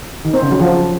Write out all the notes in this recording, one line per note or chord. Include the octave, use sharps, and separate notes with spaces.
D#3
C4
C#3
F#3
F3